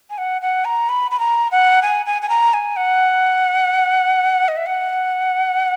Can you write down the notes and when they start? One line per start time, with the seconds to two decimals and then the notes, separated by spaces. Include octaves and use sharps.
0.10 G#5
0.18 F#5
0.42 F#5
0.65 A#5
0.89 B5
1.11 B5
1.20 A#5
1.52 F#5
1.82 G#5
2.06 G#5
2.22 G#5
2.29 A#5
2.54 G#5
2.76 F#5
4.48 D#5
4.57 E5
4.66 F#5